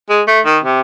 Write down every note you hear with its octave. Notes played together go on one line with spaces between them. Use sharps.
G#3
A3
D#3
C3